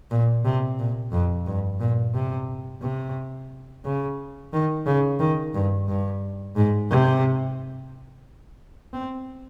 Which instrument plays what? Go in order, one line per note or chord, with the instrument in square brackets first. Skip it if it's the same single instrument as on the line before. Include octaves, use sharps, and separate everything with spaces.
[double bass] A#2
C3
A#2
F2
G2
A#2
C3
C3
C#3
D#3
C#3
D#3
G2
G2
G#2
C3
C4